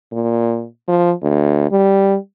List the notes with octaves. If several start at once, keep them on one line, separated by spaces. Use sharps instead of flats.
A#2
F3
D2
G3